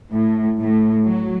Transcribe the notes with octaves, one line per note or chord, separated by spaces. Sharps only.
A2
A2
F#3